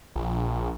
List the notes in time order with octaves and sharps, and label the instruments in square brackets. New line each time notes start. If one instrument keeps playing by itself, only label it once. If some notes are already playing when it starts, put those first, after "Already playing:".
[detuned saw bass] A#1